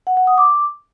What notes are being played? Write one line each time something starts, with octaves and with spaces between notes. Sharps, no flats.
F#5
F#5
D#6
D6